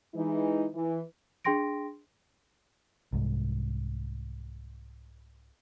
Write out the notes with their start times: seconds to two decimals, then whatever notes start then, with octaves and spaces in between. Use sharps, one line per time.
0.14 E3 G#3 D#4
0.74 E3
1.45 D4 G#4 G5 C6 A#6 D7
3.13 C2 G#2